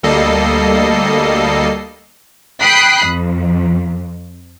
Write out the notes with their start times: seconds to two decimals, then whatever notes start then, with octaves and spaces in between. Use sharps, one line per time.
0.03 D2 G3 A#3 A4 D#5 C7
2.61 G5 B5 D#6 F#6 B6 C7
3.06 F2